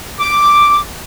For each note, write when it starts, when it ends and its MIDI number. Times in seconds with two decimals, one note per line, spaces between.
0.19 0.79 86